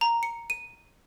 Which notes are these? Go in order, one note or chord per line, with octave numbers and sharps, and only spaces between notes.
A#5
C#7
D#7